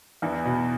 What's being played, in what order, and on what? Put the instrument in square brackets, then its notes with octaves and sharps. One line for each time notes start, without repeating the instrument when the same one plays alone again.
[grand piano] E2 E3 [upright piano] D4
[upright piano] B2